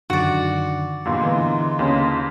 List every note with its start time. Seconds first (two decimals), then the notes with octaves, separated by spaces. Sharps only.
0.10 F#2 D3 D#3 F#4 D5
1.05 E2 G2 A#2 G#3 A#3 F4
1.23 D3 E3 B3
1.79 D#2 C#3 C#4